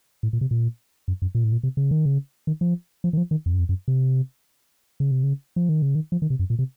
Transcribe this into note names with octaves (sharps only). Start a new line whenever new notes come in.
A2
A#2
C3
A#2
F#2
F#2
A#2
A2
A#2
C3
C#3
D#3
C#3
D#3
F3
F3
D#3
F3
D#3
F2
F#2
F2
F#2
C3
C#3
C3
C#3
F3
D#3
C#3
D#3
F3
D#3
C3
F#2
A#2
C3